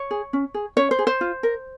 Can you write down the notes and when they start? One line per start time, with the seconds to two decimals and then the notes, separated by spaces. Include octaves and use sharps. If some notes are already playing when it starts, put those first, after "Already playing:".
Already playing: C#5
0.11 G#4
0.33 C#4
0.54 G#4
0.77 C#4 C#5
0.91 C5
0.99 G#4
1.07 C5
1.21 F4
1.43 A#4